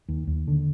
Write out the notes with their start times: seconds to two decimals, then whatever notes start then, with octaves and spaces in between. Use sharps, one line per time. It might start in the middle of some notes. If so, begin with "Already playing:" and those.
0.08 D#2
0.27 D#2
0.48 D3